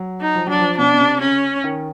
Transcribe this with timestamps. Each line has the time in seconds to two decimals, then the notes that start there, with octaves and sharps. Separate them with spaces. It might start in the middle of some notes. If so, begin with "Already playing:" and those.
Already playing: F#3
0.21 D#4
0.35 F3
0.47 F#3 D4
0.59 F3
0.77 B2 D4
0.93 B2
1.00 C3
1.20 C#3 C#4
1.64 D#3